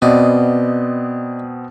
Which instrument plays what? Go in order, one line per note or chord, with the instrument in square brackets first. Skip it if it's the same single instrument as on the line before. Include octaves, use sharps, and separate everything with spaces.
[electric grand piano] B2 B3 C4 [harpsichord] D5 D#5